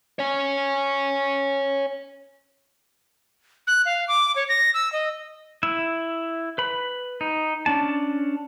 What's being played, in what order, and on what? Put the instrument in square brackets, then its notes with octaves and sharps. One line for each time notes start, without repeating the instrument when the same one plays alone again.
[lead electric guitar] C#5 G#5
[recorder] F#6
F5
D6
C#5
A#6
E6
D#5
[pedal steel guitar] E4 E5
B4 B5
D#4
C#4 D4 A5